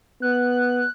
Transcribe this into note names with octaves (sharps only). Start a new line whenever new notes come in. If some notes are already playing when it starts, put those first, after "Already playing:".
B3 F#6